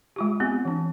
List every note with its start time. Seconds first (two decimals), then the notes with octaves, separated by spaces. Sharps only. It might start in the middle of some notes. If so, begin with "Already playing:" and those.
0.16 G#3 F4 G4
0.40 B3 C4 G4
0.65 E3 D4